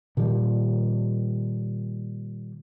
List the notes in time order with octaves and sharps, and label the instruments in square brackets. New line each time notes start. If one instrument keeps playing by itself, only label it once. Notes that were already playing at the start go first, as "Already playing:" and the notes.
[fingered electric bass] A#2 D#3 F3 G3